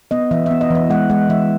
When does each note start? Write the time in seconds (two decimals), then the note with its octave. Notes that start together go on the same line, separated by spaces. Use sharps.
0.11 B3 D#5
0.31 E3 E5
0.46 B3 E5
0.61 D#5
0.71 E3 E5
0.90 G#3 F#5
1.10 G#3 F#5
1.29 E3 E5